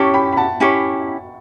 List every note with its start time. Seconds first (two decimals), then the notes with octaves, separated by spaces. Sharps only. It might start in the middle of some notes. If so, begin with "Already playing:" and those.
Already playing: C#4 E4 G4 C#5 A5 C#6
0.14 G5 B5
0.33 B5
0.37 F#5 A5
0.60 C#4 E4 G4 C#5